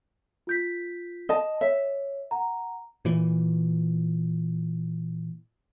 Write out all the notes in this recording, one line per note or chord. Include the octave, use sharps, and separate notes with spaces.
F4 G6 B6
D#5 A5
C#5 E5
F#5 A#5
A#2 E3